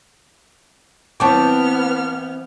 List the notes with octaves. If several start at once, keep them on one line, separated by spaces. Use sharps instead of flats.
E3 B3 C4 C#5 A5 D6 F6